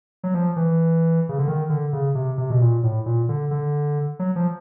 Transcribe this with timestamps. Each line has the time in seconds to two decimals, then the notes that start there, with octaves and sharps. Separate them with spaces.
0.24 F#3
0.34 F3
0.56 E3
1.29 C#3
1.38 D3
1.48 D#3
1.69 D3
1.93 C#3
2.15 C3
2.38 C3
2.50 B2
2.61 A#2
2.83 A2
3.06 A#2
3.29 D3
3.51 D3
4.19 F#3
4.36 F3